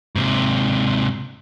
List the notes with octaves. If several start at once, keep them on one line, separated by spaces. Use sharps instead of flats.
G#2 C3